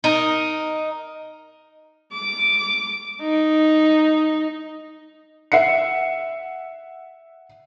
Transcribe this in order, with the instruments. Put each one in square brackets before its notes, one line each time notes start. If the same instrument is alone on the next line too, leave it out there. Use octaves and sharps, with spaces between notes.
[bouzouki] D#4 A#4
[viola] D6
D#4
[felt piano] E5 F#5 C7 C#7